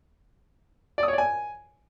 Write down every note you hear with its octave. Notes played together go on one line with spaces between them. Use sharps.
D5
D#6
C#5
D5
G#5